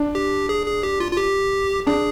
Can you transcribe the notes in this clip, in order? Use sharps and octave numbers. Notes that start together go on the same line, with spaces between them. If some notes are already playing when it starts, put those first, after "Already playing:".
Already playing: D4
G4
G#4
G#4
G4
F4
F4
G4
D4 G#4